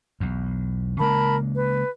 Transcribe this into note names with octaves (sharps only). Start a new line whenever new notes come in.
B1 E2
C#3 G#3 A#3 A#4 A5 B5
B4